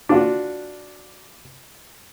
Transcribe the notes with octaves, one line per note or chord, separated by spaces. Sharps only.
D4 F4 F#4